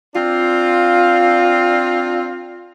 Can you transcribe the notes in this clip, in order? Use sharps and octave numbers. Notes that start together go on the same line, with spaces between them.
C4 D4 F4